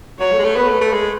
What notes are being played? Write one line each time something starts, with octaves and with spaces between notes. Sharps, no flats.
F#3 C#5
A3
G#3
A3
B3 B4
A3
A3
G#3